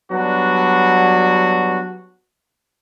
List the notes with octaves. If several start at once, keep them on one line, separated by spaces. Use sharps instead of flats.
F#3 G3 B3 D4 F#4